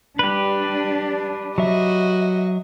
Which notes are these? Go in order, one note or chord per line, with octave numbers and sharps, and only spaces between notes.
G3 D4 G4 B4
F#3 F#4 D#5 E5